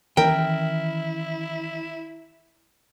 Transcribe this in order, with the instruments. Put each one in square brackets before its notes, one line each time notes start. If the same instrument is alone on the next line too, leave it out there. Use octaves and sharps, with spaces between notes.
[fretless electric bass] D#3 E3 C#4 [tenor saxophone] E4 [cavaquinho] A#4 [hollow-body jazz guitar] G5